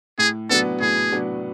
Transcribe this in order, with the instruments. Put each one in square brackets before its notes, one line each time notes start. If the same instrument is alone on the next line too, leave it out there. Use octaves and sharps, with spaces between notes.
[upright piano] A2 [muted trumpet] G#4
[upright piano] F#3 B3 D4 [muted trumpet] A4
[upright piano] A2 [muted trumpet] G#4
[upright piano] F#3 B3 D4